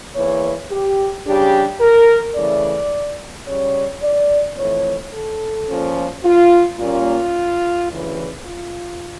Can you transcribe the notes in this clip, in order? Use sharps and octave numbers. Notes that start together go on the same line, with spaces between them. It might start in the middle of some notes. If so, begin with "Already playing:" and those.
E2 E3 A#3 C#5
G4
C#3 G3 D4 G4
A#4
C#3 E3 A3 D5
C#3 G3 C#4 C#5
D5
F2 E3 A3 C#5
A4
A#2 F3 C#4
F4
A#2 G3 A#3 C#4 F4
D2 C#3 E3
F4